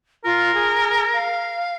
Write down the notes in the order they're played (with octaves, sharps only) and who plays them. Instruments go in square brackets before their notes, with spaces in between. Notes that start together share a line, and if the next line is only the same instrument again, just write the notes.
[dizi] F4 [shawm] A#4
[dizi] G#4
F5